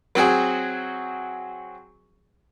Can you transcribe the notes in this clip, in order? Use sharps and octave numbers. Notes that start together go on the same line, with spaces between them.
F#3 C4 F#4 G#4